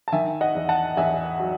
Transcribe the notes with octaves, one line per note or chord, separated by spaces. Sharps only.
A5
D#3 E5 G#5
D#5 F#5
E2
F#5 A5
E2 E5 G#5
F#3